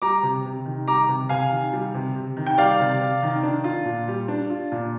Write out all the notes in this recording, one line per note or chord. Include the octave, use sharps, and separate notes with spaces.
G3 A#5 D6
C3
C3
D#3
G3 A#5 D6
C3
C3 F5 G#5
D#3
G3
C3
C3
D#3
G5
G3 D5 F5
C3
C3
D#3
D4
F4
A#2
G3
D4
F4
A#2